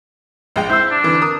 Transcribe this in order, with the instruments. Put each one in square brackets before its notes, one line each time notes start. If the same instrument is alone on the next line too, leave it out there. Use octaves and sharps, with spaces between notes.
[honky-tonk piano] A#1 G#3 G5
[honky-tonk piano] E4 E6 [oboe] C5
[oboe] D4
[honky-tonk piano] D3 E3
A#4 D#6